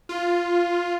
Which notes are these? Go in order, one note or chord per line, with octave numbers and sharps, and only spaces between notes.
F4